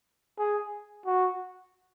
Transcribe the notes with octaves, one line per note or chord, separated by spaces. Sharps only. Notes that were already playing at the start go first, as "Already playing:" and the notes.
G#4
F#4